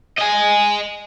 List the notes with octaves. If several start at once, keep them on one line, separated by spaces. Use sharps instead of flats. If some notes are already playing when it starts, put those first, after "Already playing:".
D#5 G#5